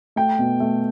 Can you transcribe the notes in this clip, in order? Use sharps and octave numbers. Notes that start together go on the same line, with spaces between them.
A3 G5
B2
A3